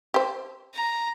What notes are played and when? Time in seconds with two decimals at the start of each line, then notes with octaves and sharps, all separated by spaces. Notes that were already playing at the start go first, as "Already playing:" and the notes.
0.14 G4 C5
0.74 A#5